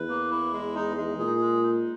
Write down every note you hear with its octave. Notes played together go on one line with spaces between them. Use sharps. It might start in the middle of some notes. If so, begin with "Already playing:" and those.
Already playing: E2 B4
A#3
E4
G#3
D#4
G#3
A#2 G#4
G#3
D#4